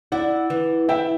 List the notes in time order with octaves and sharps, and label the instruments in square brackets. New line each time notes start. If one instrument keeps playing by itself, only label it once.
[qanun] E4 [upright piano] D5 F#5
[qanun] E3
[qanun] E4 [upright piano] E5 G5